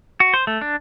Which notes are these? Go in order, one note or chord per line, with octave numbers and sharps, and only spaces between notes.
F#4
C5
A3
D4